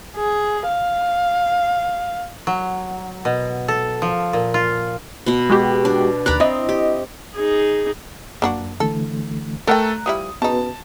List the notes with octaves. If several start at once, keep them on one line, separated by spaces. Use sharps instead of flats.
G#4
F5
F#3
B2
A4
F3
A#2
F4
B2 B3
G#3 F#4 G4
D4
D#2 D5 A#5 B5 F#6
C4 E4 D#5
G4
D#4 G#4
F#2 A#3 D4 F#4
D3 E3 A3 A4
A3 A4 A#4 F#5 G5 A#5 F#6
F3 G3 E4 D#6
C#3 B3 D#4 F#4 B4 A5